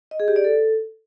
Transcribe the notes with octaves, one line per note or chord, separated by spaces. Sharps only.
D#5
G#4
G4
D5
A4